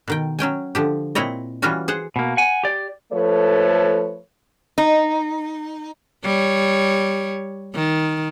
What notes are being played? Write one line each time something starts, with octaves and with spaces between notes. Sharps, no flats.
B2 D#3 G5
F#3 C#4 G5 G#5
D3 F3 G4
A#2 C4 E4 C#5 D#5
E3 G3 C#4 F4 F#4 G#5
G#4 C5 F#5
B2 A#3
F#5 G#5
G4 D5
F3 A3 A4 B4 C#5
D#4
G3 C#5
D#3